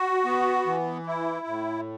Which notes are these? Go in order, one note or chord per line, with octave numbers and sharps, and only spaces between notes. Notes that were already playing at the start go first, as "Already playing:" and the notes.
Already playing: F#4
B3
E3
E4
A2